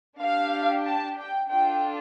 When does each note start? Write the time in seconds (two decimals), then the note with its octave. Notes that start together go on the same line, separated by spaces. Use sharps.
0.19 D4 G4 F5
0.86 A5
1.19 G5
1.51 D4 F4 A4 G5